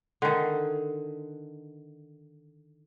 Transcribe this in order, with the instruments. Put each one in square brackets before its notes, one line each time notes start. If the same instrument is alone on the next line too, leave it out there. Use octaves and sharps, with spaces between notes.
[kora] D3 D#3